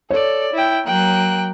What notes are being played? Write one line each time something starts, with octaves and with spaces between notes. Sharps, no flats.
A4 C#5 D5
E4 G5
F#3 A#3 G5 F#6